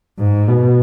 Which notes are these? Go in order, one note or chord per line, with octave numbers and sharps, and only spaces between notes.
G#2
B2